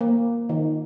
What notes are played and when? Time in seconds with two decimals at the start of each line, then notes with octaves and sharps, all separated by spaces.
0.01 A#3
0.49 D#3